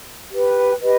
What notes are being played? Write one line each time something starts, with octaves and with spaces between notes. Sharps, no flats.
G4 B4
G4 B4 D#5